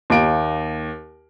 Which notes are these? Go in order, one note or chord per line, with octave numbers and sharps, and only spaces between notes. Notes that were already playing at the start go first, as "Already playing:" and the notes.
D#2 D7